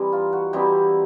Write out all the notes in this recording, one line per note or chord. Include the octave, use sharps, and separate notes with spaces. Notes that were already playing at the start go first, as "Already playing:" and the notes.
Already playing: E3 G3 C4 D#4
F4
F#4
E3 G3 C4 D#4 G4